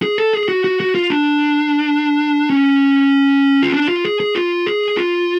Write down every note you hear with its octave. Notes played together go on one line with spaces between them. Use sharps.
G#4
A4
G#4
F#4
F#4
F#4
F4
D4
C#4
F4
D4
F4
G#4
G#4
F4
G#4
F4